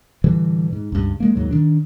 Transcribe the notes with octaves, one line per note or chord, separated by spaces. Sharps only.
A2 D3 E3 G3
G#2
C#2 G2
G#3 A#3
D#2 G#2 F#3
D#3 D4